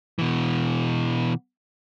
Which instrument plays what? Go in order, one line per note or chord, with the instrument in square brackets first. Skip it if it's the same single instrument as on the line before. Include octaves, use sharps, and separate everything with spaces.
[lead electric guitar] B2 E3